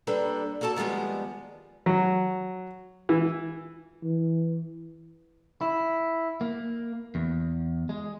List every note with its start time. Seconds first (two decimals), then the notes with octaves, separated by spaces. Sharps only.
0.07 G3 A#3 D4 A4 B4
0.61 A#3 F#4 A4 G#5 A5
0.76 D#3 F3 G3 G#3 B3
1.86 F#3
3.09 E3
4.03 E3
5.61 E4
6.41 A#3
7.15 E2
7.89 G#3